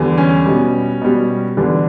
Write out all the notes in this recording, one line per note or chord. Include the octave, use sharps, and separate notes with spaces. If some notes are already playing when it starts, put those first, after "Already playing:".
Already playing: E2 D3 G3
C#4
B2 G3
B2 G3
E2 D3 G3 D4